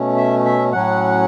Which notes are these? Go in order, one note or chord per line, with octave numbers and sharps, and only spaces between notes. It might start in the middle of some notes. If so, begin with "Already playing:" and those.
Already playing: B2 A3 C#4
E5
E5
A2 F#3 C#4 F#5